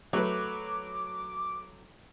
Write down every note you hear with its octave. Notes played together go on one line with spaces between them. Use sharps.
F#3 A3 B4 D6